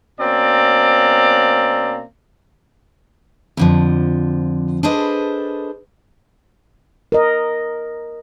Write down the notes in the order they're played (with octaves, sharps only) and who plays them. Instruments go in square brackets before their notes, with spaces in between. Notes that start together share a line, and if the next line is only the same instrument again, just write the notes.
[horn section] B2 A#3 C4 C#4 D5 A#5
[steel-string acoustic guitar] F2 D3 F3
D4 G#4 A4 B4 C5 D#5
[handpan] A#4 D#5